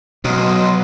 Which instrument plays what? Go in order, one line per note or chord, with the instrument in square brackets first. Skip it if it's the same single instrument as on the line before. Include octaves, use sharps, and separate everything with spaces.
[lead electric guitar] B1 [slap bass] B2 [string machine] F#3 B4 [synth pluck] C6 D#6